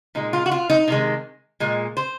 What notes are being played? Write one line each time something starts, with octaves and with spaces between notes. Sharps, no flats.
A#2 G#3 D#4
F4
F#4
F4
D#4
C3 D#3 G#3
A#2 G#3
C5